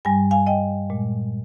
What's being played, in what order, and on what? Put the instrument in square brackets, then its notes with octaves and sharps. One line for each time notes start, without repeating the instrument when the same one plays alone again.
[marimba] G2 G3 G#5
F5 G#5
D#5 G5
A#2 G#3